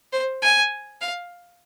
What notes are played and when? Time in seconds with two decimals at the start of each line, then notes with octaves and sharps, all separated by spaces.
0.13 C5
0.42 G#5
1.01 F5